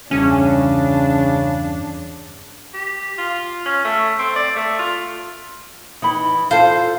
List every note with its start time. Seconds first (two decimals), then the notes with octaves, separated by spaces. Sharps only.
0.11 E2 G2 C#3 C#4 D4 G#4
2.74 G4
3.18 F4
3.66 C#4
3.85 A3
4.19 C4
4.36 D5
4.56 A3
4.79 F4
6.02 E3 D#4 B5
6.51 F4 A4 C5 F5